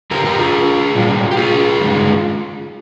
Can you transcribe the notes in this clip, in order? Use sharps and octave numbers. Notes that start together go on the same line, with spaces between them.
F2 D3 F3 G4 A#4
G4 A#4
F4 G#4
A#2 G3 A#3
G4
F4 G#4
G2 D#3 G#3